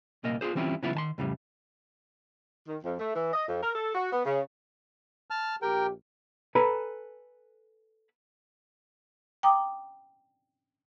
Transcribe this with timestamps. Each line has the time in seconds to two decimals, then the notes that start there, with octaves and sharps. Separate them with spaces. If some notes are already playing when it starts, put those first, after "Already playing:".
0.24 C2 A#2 A#3 D#5
0.41 F4 F#4 G#4 C5
0.55 E3 G3 C4 C#4 E4 F4
0.83 C#3 E3 F#3 B3 E4 F4
0.95 D#3 A5 C6
1.18 F2 A2 C#3 G3
2.67 D#3
2.84 F2
3.00 A3
3.15 E3
3.33 D#5
3.48 F2
3.63 A#4
3.75 A4
3.95 F#4
4.13 B3
4.26 C#3
5.30 A5 F6
5.62 A#1 G4 A#4 G5
6.55 A4 B4 G#5 A#5 B5
9.43 G5 A#5 D6 D#6